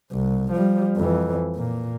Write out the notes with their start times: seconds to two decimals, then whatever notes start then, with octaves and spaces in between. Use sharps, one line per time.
0.12 C2
0.52 F3 G3
0.96 F2 E3
1.56 A#2 A#3